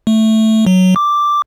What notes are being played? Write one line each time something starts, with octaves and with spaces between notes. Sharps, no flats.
A3
F#3
D6